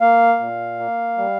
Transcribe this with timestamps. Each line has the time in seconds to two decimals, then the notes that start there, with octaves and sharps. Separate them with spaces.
0.01 A#3 F5
0.40 A#2
0.79 A#3
1.18 G3